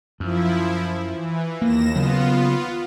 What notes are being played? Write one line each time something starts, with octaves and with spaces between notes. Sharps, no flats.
F#2 F3 E4
E3
D#2 A#3 A#6 E7
C#3 F#3 B3 F4